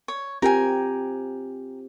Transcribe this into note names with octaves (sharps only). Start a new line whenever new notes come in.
C#5
C4 F4 G4 A#4 G5 G#5